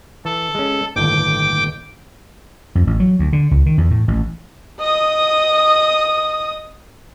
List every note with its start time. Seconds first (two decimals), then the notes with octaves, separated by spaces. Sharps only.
0.25 E3 A4
0.55 G#3 C#4
0.96 G1 D#2 A2 G5 D6
2.75 F2
2.87 A1
3.00 F#3
3.19 D2
3.33 D3
3.51 C#2
3.66 D#3
3.78 E2
3.91 A2
4.08 A1
4.80 D#5 D#6